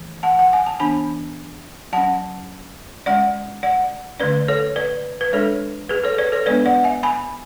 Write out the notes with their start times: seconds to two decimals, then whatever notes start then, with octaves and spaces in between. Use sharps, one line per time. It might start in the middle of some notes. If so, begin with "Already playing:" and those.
Already playing: E3 A3
0.23 F#5 A5
0.39 F#5
0.53 G#5
0.66 A5
0.80 E3 B3 D4 G#5 B5
1.93 F#3 C#4 F#5 A5
3.06 G#3 C#4 D5 F#5
3.63 D5 F#5
4.20 D3 A3 C#4 B4 D5
4.48 A4 C#5
4.76 B4 D5
5.21 B4
5.33 G#3 D4 A4 C#5
5.89 G#4 B4
6.04 A4 C#5
6.18 B4 D5
6.32 A4 C#5
6.46 G#3 B3 D4 B4 D5
6.66 D5 F#5
6.84 E5 G#5
7.03 G#5 B5